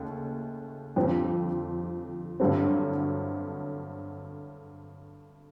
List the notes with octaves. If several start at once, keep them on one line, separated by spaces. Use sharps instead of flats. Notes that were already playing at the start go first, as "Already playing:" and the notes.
Already playing: D#2 C#3 A3
F2 D3 G3 C4
G2 D3 F#3 A3 C4